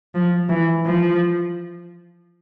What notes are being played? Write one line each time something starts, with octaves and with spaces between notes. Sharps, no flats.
F3
E3
F3